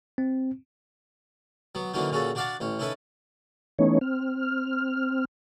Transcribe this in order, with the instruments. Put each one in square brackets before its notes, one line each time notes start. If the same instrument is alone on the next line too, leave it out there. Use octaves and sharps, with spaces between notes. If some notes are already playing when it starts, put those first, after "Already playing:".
[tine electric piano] C4
[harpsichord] F#3 B3
D3 E3 F#3 A#3 C#4 D#4
A#2 C#3 C#4 F#4 A4
D4 F#4 D5 F5 F#5 A5
A1 C#4
C#4 D#4 E4 A4 B4
[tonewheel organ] E3 A3 B3 C#4 D#4 C#5
C4 F6